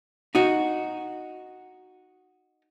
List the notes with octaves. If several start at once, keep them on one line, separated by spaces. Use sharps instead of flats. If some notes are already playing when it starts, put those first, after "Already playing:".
D#4 F#4